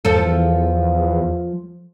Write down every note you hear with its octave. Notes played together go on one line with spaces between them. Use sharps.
E2 F3 A4